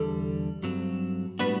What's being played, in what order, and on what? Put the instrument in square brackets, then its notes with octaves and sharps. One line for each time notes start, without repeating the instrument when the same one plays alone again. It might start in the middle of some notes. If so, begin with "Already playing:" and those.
Already playing: [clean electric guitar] E2 D3 G3 [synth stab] A4
[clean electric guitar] G2 F#3 C4
[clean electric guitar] A2 G3 B3 D4 F#4 [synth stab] B4